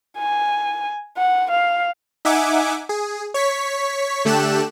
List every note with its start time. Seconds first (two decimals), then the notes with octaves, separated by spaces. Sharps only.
0.18 G#5
1.17 F#5
1.51 F5
2.25 D#4 E5 F#5 G#5 D6
2.89 G#4
3.34 C#5 C#6 B6
4.25 D3 A3 G4 A4 F#6 E7